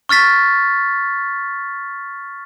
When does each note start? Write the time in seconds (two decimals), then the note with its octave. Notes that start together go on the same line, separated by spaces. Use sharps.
0.09 C#6 F6 A6 B6